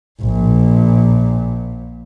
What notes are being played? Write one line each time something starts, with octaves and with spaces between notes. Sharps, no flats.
A#1 A#2